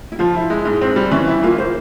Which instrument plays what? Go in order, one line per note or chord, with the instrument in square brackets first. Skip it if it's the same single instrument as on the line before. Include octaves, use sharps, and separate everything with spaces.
[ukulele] E4
[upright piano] F3 [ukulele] F4
[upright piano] E4
G#3
[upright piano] G#2 [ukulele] E4
[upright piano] C4
G3
[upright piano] E3 [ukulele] C#4
[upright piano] E4
[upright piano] A#3 [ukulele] F4
[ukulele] C5